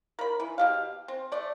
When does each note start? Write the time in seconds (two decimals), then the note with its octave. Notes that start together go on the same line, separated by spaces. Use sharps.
0.19 A#4 B5
0.40 E3
0.58 B2 G4 F5
1.08 C4
1.32 A3 D5